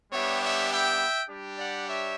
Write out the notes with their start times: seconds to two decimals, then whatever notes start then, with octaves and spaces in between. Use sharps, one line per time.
0.11 G3 B3 D4 G4 C#5 E5
0.41 C#5 E5
0.70 E5 G5
1.28 G3 D4 G4
1.57 D5 F#5
1.86 C#5 E5